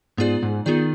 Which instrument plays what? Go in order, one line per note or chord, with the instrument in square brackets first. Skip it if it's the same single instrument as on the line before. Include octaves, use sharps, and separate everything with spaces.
[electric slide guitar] G#2 [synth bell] B3 F4 G#4 D5
[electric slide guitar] G#2
[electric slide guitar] D#3 [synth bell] B3 F4 G#4 D5